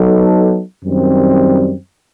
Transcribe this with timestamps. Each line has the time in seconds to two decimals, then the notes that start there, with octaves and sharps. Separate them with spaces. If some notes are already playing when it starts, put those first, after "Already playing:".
Already playing: F#3 B3 D#4 A4
0.84 F#2 D#3 G3 C4